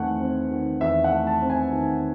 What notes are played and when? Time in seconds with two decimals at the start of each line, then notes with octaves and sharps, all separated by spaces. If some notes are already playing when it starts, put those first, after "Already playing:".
Already playing: E2 D#3 A3 C4 F#5 G#5
0.20 C4
0.51 D#3
0.81 E2 E5
1.04 F#5
1.11 A3
1.27 A5
1.42 C4
1.50 G#5
1.73 D#3